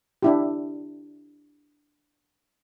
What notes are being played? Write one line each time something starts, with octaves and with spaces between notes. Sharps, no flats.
D4 E4 G4